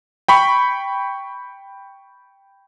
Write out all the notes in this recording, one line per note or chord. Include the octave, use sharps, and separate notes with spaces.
G5 B5 C#6